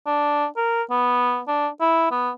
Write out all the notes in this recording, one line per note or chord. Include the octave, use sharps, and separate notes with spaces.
D4
A#4
B3
D4
E4
B3